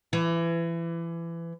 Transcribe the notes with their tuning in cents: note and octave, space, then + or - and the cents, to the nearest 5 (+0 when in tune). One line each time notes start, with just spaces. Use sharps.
E3 +25